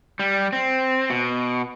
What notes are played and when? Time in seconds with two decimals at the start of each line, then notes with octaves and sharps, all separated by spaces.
0.19 G3
0.53 C4
1.10 B2